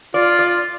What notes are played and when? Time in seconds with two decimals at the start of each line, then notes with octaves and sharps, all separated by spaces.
0.14 F4 D5
0.39 D5